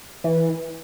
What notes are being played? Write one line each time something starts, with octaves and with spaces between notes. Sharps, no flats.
E3